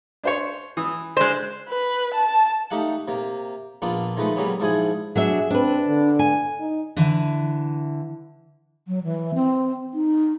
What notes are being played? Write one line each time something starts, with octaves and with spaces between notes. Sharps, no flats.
D4 C5 C#5
E3 D#6
G#3 D4 C5 F#6
B4
A5
A3 D#4 G4 F5 F#5
C3 A#3
A#1 A#3 B3 D4 F4
D#3 F3 G#3 A3 B4
C#3 F#3 G3 A#3 B3 C#4
G#2 F3 D4 E4 G#4 G#5
F#3 D4 G#4 E5
C4 D4 B4
D3
G#5
D#4
D3 E3
F#3
E3
C4
D#4